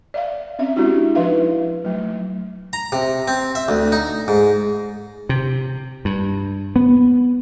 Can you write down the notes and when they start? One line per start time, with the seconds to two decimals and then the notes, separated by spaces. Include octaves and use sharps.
0.14 D5 E5 F5
0.59 C4 C#4 E5
0.76 G#3 C#4 D4 E4 F#4 G4
1.15 F3 D#4 E4 B4 E5 F5
1.84 F#3 A3
2.73 A#5
2.92 C3
3.28 C4
3.55 E5
3.68 D2
3.92 D#4
4.28 G#2
5.29 C3
6.05 G2
6.76 B3